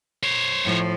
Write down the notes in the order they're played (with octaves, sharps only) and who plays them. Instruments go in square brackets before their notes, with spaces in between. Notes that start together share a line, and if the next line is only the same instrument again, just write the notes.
[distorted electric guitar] C5 C#5
[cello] A2 F3